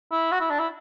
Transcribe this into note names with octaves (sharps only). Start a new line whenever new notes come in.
E4
F#4
E4
D4
E4